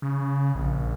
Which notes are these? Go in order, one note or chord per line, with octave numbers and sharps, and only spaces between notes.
C#3
A#1